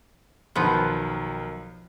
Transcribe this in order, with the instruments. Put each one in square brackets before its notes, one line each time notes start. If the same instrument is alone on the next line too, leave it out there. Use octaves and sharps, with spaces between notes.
[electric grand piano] B1 D#3 [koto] F3 B3